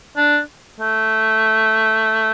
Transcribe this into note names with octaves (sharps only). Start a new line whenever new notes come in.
D4
A3